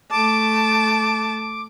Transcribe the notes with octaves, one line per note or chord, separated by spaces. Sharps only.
A3 A5 D6